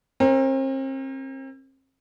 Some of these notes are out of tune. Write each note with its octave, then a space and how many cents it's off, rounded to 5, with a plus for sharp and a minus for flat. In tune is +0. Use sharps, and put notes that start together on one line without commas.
C4 +40 A#4 +0